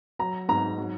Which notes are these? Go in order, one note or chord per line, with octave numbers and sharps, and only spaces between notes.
F#3 A#5
G#2 A#5
F#3